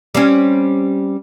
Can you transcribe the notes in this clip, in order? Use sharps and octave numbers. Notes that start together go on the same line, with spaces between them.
G3 C4 C#4